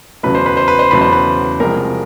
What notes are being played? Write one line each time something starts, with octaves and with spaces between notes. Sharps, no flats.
E2 C#3 F#3 A3 B4
C5
B4
C5
B4
C5
E2 C#3 F#3 A3 B4
C5
B4
C2 C3 F3 G#3 A#4